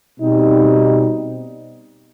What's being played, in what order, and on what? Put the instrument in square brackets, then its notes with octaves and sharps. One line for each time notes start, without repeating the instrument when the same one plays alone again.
[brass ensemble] B2 G3 C4 D#4